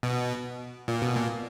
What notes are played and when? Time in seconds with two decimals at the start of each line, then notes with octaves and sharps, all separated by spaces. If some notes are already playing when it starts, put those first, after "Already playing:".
0.03 B2
0.88 A#2
1.02 B2
1.16 A#2